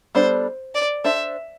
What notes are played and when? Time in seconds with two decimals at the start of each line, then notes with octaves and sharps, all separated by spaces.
0.15 G3 B3 D4 A4 C5 D5
0.75 D5
1.04 D4 A4 C5 E5